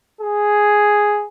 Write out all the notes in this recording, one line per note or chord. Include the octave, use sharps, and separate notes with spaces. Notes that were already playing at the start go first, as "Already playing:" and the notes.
G#4